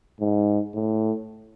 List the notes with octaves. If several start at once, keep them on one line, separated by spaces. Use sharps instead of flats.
G#2
A2